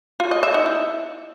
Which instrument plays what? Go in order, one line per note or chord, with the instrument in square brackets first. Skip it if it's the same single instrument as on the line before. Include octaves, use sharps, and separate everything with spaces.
[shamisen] F4
D#5
E5
D#4
E4